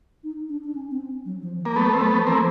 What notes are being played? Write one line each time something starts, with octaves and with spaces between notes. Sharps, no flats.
D#4
D4
D4
C#4
C4
F#3
F3
E3
A#3
F#3 A3 B3
C4
F#3 A3 B3
F3
E3 A#3 C4
F3